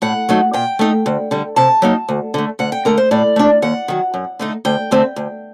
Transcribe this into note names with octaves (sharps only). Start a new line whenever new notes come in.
A2 F#5
F#3 A3 D#4
A#2 G5
A3 D#4
D2
D3 G3
C3 A5
F#3 A#3 D#4
D2
D3 A3
D2 F#5
G5
D3 A3 A#4
C5
A2 D5
A3 D4
D#2 F#5
D#3 F#3
F#2
D3 A3 D#4
D2 G5
D3 A3 C4
D2